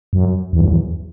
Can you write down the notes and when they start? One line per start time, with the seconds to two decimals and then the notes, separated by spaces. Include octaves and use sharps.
0.13 F#2
0.53 E2
0.61 F#2
0.68 E2